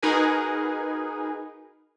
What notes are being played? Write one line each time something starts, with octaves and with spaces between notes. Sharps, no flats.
D#4 F#4 G#4 A#4 B4 G#5